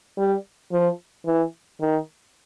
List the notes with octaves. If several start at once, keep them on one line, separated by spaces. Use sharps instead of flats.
G3
F3
E3
D#3